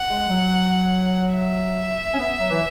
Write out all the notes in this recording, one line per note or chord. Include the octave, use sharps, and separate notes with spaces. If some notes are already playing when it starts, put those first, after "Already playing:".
Already playing: F#5
G#3
F#3
E5
C#4
B3
F#3
E3